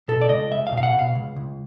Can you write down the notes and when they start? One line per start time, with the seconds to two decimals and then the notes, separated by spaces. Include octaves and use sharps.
0.08 B2 A4
0.21 D5
0.29 C#2 D#5
0.51 C#2 E5
0.67 F5
0.72 B2
0.78 F5
0.83 F#5
0.93 B2
0.99 F5
1.15 C#2
1.36 C#2